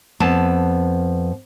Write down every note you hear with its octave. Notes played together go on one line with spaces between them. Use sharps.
F2 B3 A5